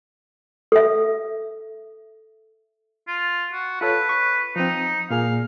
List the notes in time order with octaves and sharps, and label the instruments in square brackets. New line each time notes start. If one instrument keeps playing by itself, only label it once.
[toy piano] A4 E5
[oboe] F4
F#4
[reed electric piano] F4 A4 C#5 [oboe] B4
[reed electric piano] C#6
[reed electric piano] F3 C4 [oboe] D#4
[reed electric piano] A#2 A#3 G#4 [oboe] F5